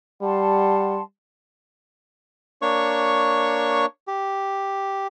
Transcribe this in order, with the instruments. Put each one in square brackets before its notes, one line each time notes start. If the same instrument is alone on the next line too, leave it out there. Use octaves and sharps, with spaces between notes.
[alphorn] G3 [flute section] F#5 A5 C6
[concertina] A#3 D4 C#5 C#6
G4